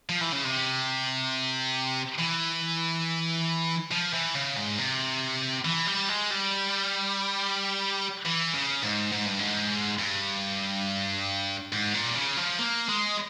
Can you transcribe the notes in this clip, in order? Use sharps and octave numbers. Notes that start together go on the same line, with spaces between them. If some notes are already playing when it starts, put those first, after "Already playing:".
F3
E3
C#3
C3
E3
F3
E3
C#3
G#2
C3
E3
G3
G#3
G3
E3
C#3
G#2
G#2
G2
G#2
G2
G#2
A#2
C#3
F3
A#3
G#3